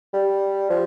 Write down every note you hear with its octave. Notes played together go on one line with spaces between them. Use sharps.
G3
F3